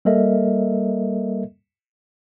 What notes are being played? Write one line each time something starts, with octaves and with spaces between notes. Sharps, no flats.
G3 A#3 A4 A#4 D#5 E5